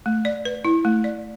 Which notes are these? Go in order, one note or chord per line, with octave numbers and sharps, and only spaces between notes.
A3
D5
B4
E4
A3
D5